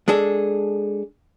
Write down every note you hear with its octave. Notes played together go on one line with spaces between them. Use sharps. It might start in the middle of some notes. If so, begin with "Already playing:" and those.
G#3 D4 G#4 A4